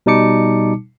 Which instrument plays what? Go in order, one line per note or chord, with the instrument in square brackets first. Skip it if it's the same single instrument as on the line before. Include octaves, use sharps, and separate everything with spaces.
[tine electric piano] B2 G3 D#4 A5 D6 C#7